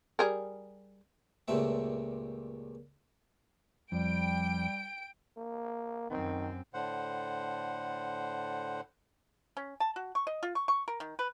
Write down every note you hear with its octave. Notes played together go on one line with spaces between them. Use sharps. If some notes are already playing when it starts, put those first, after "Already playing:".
G3 G#4 A#4
C#2 G2 A#2 A3 C4 E5
F2 G3 G5 D7
A#3
F#2 D#3 C4
A2 D3 C5 F#5
C#4
A5
F#4
C#6
D#5
F4
C#6
C#6
A#4
D#3
B4